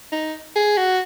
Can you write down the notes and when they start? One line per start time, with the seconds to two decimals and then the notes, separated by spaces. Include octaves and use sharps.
0.12 D#4
0.56 G#4
0.77 F#4